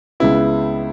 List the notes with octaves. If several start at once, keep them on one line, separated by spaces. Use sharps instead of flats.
C#2 C#3 G#3 B3 E4